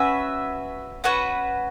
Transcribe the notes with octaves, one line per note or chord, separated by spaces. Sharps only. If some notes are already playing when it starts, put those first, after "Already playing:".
Already playing: C#4 F#4 B4 E5
C#4 F#4 B4 F#5